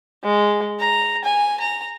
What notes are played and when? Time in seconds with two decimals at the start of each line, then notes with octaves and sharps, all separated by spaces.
0.24 G#3
0.81 A#5
1.24 G#5
1.60 A#5